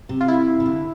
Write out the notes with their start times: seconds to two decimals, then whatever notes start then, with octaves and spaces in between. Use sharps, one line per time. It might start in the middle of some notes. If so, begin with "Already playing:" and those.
0.09 C3
0.21 F4
0.28 E4
0.60 C3
0.66 D3